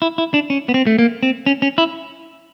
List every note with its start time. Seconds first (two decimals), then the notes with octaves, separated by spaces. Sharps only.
0.02 E4
0.18 E4
0.34 D4
0.50 C#4
0.69 B3
0.74 C4
0.87 A3
0.99 A#3
1.23 C4
1.46 C#4
1.62 C#4
1.78 E4